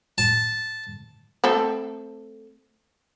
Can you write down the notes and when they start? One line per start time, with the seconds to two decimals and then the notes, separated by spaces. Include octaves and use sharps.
0.18 A5
1.44 A3 C4 A4